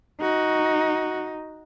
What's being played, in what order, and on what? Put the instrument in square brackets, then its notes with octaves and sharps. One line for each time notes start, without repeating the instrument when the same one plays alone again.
[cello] D#4 [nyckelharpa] F#4